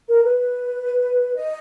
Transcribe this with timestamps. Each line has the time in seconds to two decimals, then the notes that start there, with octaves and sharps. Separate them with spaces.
0.08 A#4
0.23 B4
1.36 D#5